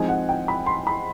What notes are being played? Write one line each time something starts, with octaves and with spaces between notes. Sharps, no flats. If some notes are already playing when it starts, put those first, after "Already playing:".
Already playing: F3 G#3 C4 D#4 G#5
F#5
G5
B5
C6
B5